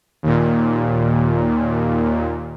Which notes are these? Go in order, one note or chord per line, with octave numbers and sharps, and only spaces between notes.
D#2 A#2